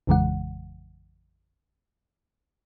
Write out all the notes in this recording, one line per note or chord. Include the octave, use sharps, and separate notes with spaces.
A1 F2 C#3 E3 G#3 F#5